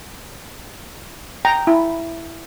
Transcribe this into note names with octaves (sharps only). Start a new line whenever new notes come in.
G5 A#5
E4